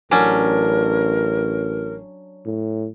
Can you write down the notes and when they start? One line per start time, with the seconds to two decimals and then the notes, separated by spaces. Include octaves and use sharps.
0.11 A1 F#3 C#4 D4 A#4
2.46 A2